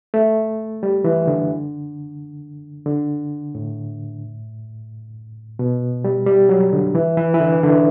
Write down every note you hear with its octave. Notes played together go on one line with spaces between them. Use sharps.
A3
G3
E3
D3
D3
A2
B2
G3
G3
F#3
D3
E3
E3
E3
D3
D3